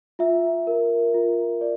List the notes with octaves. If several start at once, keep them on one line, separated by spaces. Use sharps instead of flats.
F4 E5
A#4
F4
D5